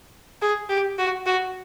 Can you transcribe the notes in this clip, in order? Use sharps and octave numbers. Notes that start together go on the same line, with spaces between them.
G#4
G4
F#4
F#4